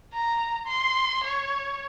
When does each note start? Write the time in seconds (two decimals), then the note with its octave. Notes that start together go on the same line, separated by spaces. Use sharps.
0.14 A#5
0.66 C6
1.23 C#5